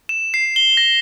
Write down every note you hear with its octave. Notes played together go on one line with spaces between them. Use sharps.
E7
C7
G7
A#6